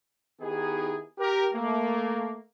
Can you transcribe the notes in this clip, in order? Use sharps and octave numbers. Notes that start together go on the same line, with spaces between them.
D#3 B3 D#4 E4 G4 G#4
G4 A#4
A3 A#3